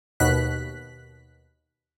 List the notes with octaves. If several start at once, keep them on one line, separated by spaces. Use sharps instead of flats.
D#2 B2 F#6 B6